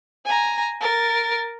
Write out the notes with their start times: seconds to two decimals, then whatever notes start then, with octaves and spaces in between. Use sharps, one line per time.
0.25 G#5 A#5
0.81 A#4 A6